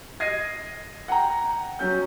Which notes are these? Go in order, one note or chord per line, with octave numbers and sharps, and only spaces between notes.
D#5 G#6 A#6 C7 D#7
F#5 G5 A#5
F#3 C#4 G6